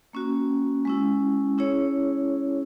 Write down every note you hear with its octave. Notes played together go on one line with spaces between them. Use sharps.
A#3 C#4 F#4
G#3 C#4 E4
C#4 E4 G#4 C#5